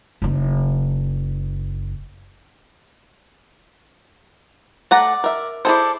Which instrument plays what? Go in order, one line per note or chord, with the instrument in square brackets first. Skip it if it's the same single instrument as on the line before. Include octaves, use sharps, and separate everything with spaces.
[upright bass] F#1 D#4
[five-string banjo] A3 F#5 A#5 [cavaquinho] D5
[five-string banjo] A#4 E5
[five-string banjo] E4 G#4 C5 [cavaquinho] A4 D5